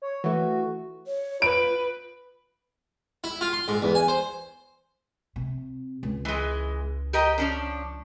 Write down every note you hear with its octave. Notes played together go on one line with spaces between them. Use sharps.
C#5
E3 A3 F#4
C#5
F4 B4 D7
E4
F4
C6
G#2
E2
G#5
C5
C3
C#2
E3 G#3
G4 A#4 D#5
F3 C#4 D4